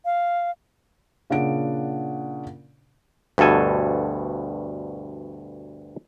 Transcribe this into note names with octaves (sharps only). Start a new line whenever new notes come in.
F5
A#2 C#3 D4 F#5 D7
D2 G2 B2 A4 G#5